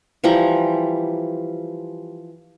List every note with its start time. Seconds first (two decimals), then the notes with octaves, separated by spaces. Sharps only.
0.24 E3 F3 G3 A#5